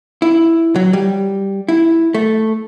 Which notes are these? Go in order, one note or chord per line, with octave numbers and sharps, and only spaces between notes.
E4
F#3
G3
E4
A3